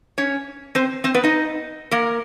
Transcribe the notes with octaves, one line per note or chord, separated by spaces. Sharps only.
C#4 C#5
C4 C5
C4 C5
B3 B4
D#4 D#5
A#3 A#4